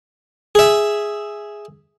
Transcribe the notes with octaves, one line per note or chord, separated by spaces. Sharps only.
G#4 E5